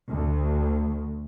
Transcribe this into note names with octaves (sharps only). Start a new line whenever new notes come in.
D2